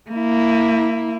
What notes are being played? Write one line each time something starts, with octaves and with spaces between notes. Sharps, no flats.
A#3 E4